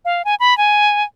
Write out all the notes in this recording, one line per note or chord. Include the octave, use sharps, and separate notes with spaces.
F5
G#5
B5
G#5